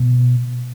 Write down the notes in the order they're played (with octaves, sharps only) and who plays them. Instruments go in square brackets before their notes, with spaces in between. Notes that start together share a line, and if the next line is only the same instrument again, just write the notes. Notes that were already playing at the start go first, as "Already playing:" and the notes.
Already playing: [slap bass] B2